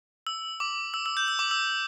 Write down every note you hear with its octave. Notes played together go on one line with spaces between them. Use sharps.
E6
D6
E6
E6
G6
E6
D6
E6